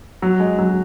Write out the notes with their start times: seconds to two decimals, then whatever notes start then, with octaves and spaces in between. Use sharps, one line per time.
0.22 F#3
0.40 G#3
0.59 F#3